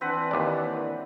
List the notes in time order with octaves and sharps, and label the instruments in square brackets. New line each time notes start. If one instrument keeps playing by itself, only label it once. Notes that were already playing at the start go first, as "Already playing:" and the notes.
[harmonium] E3 D4 [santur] C4 B4 F#5
[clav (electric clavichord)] D#2 D5